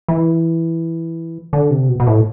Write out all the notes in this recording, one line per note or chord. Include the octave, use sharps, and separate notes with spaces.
E3
D3
C3
B2
B2
A2